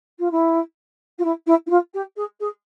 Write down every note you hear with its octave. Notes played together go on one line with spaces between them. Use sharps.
F4
E4
F4
E4
E4
E4
F4
G4
G#4
G#4